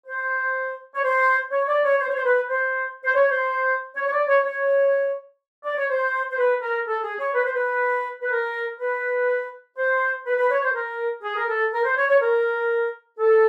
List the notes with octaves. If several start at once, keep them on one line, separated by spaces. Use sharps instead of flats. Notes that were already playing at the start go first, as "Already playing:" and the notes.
C5
C#5
C5
C#5
D5
C#5
C5
C#5
C5
B4
C5
C5
C#5
C5
C#5
C#5
D5
C#5
C#5
D5
C#5
C5
C5
B4
A#4
A4
G#4
C#5
B4
C5
B4
B4
A#4
B4
C5
B4
B4
C#5
C5
A#4
G#4
A#4
A4
A#4
C5
C#5
C#5
A#4
A4